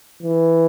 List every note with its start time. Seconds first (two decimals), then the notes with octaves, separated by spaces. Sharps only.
0.23 E3